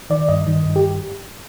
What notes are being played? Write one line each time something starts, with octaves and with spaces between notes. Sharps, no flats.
D#3 D5
G2 D#5
D#3
G2
G4